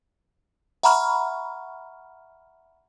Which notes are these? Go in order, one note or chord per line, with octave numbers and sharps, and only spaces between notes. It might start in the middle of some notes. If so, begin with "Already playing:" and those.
E5 F#5 A#5 B5 C#6 F6